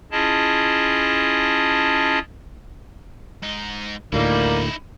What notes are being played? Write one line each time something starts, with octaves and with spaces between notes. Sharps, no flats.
C#4 E4 F4 G#4 D#5 A5
G#2 D#4
D2 A2 D#3 G3 A#3 D#4 E4